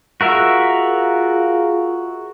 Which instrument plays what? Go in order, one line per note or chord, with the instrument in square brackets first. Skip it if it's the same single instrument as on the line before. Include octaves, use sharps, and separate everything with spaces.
[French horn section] F4 G#4 [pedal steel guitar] F#4 A#4 E5